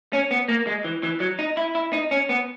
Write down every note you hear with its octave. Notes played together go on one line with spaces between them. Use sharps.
C#4
B3
A#3
G#3
E3
E3
F#3
D#4
E4
E4
D#4
C#4
B3